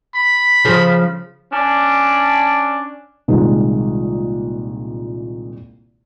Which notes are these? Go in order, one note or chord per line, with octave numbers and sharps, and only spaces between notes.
B5
C#3 F3 C5
C#4 D4
C2 A#2 D#3 G#3